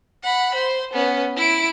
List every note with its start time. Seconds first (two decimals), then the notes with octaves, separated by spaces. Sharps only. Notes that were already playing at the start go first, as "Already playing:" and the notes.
0.23 F#5 B5
0.55 C5
0.93 B3 C#4
1.36 E4 D7